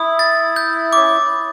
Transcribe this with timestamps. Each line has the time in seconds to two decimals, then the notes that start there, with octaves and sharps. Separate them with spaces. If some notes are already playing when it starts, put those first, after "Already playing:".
Already playing: E4 D#6
0.19 A6
0.56 G6
0.93 C#4 D6